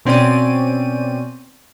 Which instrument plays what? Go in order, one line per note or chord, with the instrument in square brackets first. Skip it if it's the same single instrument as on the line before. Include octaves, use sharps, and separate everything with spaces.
[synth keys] B2 C4 C#4 D5 D#7